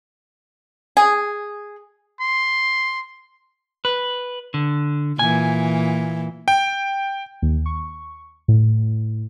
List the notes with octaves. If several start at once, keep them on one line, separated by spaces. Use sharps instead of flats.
G#4
C6
B4
D3
A#2 E3 G#5
G5
D#2
C#6
A2